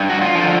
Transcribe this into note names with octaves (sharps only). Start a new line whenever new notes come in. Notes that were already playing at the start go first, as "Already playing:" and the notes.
Already playing: G2
F#4
F4
D3 F3